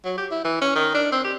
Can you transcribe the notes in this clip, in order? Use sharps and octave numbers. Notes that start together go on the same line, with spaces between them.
F#3
G4
E4
E3
C#4
D#3
D4
C4
G4